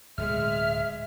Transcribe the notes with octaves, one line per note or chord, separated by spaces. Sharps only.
D1 B2 G#3 E5 F6